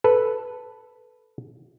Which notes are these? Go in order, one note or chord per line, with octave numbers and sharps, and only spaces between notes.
A4 B4